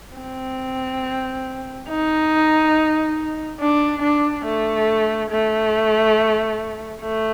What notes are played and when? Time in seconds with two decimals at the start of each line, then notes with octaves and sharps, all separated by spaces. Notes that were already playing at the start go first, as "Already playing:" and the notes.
0.17 C4
1.89 D#4
3.60 D4
4.02 D4
4.45 A3
5.31 A3
7.02 A3